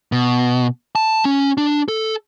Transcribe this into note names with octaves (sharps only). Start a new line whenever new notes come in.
B2
A5
C#4
D4
A4